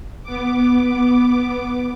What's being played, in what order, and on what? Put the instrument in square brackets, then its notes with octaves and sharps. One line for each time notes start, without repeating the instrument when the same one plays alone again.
[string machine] B3 D6